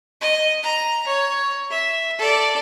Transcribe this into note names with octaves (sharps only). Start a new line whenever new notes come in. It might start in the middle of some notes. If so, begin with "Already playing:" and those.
D#5
A#5
C#5
E5
A4 D5